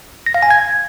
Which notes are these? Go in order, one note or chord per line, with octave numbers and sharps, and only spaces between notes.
A#6
F5
G#5
G#6